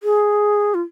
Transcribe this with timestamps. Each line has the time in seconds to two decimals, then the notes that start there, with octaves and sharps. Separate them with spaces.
0.03 G#4
0.74 F4